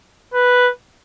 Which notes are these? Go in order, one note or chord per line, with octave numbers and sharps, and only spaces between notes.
B4